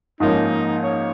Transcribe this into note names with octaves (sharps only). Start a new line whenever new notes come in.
G#2 F3 A#3 C#4 D#4
C#5